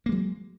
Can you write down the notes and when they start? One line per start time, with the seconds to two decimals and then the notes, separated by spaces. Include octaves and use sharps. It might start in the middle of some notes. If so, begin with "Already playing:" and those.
0.06 A#3
0.09 G#3
0.12 F#3